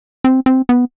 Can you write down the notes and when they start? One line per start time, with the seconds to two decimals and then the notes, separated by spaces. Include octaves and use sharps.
0.24 C4
0.46 C4
0.69 B3